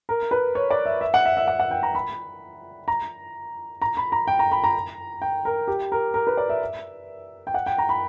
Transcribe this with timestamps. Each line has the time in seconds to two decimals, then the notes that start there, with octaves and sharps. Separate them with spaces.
0.09 A#4
0.31 B4
0.55 C#5
0.70 D5
0.86 E5
1.01 E5
1.14 F#5
1.25 E5
1.37 E5
1.48 F#5
1.60 F#5
1.71 G5
1.83 A#5
1.95 B5
2.88 A#5
3.82 A#5
3.97 B5
4.12 A#5
4.27 G5
4.39 A#5
4.52 B5
4.64 A#5
5.22 G5
5.45 A#4
5.68 G4
5.92 A#4
6.14 A#4
6.27 B4
6.37 D5
6.49 E5
7.47 G5
7.54 F#5
7.66 G5
7.78 A#5
7.89 B5